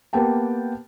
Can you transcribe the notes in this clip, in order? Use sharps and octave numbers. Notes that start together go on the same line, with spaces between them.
A#3 B3 G4 G5 A5